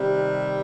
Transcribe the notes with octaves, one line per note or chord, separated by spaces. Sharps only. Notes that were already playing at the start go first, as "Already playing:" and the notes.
Already playing: C3 D#3 G3